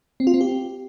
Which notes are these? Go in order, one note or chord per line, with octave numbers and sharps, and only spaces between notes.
C4
F4
C4
G4